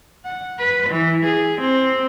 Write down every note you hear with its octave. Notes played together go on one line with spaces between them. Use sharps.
F#5
B4
E3
G#4
C4